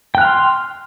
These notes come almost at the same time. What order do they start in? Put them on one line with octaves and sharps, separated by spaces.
G5 F#6 F6 C6